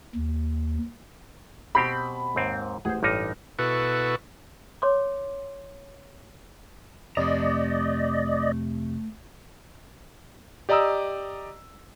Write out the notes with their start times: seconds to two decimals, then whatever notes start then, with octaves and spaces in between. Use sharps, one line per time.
0.15 D#2
1.75 B2 C4 G4 B5
2.36 D#2 G#2 C4
2.85 A1 G#4 C5 F#5
3.03 A1 G2 D#4 D6 F6 A#6
3.59 B2 E4 F#4 A4 B4 C#6
4.82 C#5 C6 D6
7.17 F2 C3 A3 D5 D#5 A#5
10.69 G4 D5 D#5 A#5 D#6 E6